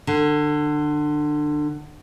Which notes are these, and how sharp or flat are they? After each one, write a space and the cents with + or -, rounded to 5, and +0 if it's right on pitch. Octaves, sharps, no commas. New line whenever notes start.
D3 +25